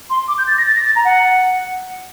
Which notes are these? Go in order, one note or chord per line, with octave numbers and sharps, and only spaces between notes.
C6
D6
G6
A6
A#6
A6
A#6
A6
A#5
F#5